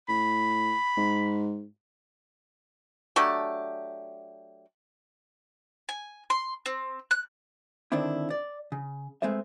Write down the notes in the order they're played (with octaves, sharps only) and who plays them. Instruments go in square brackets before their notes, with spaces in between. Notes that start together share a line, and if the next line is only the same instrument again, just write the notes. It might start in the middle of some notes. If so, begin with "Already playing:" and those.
[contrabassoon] A2 [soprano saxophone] B5
[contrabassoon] G#2
[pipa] F#3 A3 D4 G4
[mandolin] G#5
C6
C4
F#6
[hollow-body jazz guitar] D3 D#3 C4 D4 E4
D5
C#3
G#3 A3 C4 B4 E5